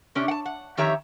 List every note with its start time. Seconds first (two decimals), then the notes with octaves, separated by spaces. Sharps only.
0.15 C3 C#4 D4 G4
0.28 F#5 A5
0.46 F#5
0.77 F2 D#3 G4 C#5 E5 A#5